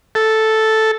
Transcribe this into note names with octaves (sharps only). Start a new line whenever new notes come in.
A4